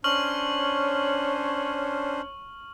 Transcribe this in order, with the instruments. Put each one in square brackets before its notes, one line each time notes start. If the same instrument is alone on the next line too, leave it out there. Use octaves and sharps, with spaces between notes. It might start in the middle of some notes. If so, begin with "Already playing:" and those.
[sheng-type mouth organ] C#4 D4 C5 [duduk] C#5 [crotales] C#6 F6 F#7